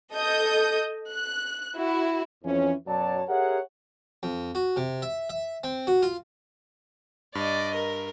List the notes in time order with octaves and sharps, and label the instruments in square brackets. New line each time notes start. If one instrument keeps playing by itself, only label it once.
[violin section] A4 D#5 D#6 G6
F#6
E4 F#4
[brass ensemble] F2 E3 C#4
F#2 B2 F#3 C#5 D5 A5
G4 G#4 A#4 C#5 E5 F#5
[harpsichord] F2
F#4
C3
E5
E5
C4
F#4
F4
[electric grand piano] G2 [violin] D5 D#5
[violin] A#4